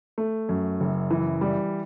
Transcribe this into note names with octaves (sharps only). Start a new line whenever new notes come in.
A3
F#2
F#1
E3
G3